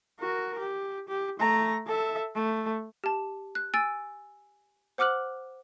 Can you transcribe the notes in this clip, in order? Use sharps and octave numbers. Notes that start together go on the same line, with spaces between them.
F#4 A#4
G4
G4
A3 A#5
A4 E5
A3
G4 A5
F#6
G#5 E6 A6 D7
C5 F#5 D6 F6 F#6 F#7